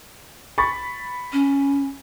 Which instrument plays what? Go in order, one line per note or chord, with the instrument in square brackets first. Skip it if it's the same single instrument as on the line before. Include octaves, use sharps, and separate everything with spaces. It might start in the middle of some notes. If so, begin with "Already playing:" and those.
[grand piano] B5 C#6 A6
[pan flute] C#4